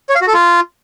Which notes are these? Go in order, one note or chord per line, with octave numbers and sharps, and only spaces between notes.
C#5
F5
F#4
A4
F4